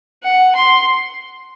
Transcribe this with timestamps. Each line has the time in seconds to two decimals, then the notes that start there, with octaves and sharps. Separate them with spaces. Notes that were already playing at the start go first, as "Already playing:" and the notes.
0.24 F#5
0.55 C6